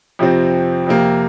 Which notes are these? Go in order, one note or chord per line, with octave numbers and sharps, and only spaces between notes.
F2 C3 F3 C4
F2 C3 A#3